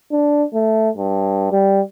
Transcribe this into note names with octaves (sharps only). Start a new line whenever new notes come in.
D4
A3
G2
G3